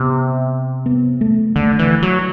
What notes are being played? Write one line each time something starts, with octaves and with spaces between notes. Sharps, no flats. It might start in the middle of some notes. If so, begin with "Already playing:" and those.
Already playing: C3 B3
B3
A3
D3 A3
E3
F#3